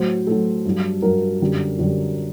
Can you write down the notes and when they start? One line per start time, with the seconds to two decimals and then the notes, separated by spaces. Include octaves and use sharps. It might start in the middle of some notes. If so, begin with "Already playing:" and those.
Already playing: A2 F#3 C5
0.27 A2 F#3 A4
0.66 G2 F#3
1.02 G2 F#3 A#4
1.41 F#2 D3 G3
1.79 F#2 D3 G3